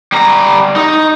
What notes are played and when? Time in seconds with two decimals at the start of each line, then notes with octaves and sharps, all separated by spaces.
0.12 G3 A#5
0.76 D#4